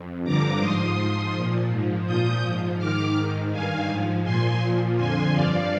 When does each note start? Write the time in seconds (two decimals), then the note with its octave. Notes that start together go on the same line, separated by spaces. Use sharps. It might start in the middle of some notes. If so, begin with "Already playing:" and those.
Already playing: F2
0.24 G2 D3 F3 A#5 D6
0.60 G#2 F3 C6 D#6
0.97 G#2 F3 C6 D#6
1.33 A#2 F3
1.69 G#2 F3
2.06 A#2 F3 D#6 G6
2.42 G#2 F3
2.78 G#2 D#3 D6 F6
3.15 G#2 D#3
3.51 G2 D#3 F5 G#5
3.87 G#2
3.92 F3
4.24 A#2 F3 G#5 C6
4.60 A#2 F3
4.96 F2 D3 F3 G#5 C6
5.33 G2 F3 D5 F5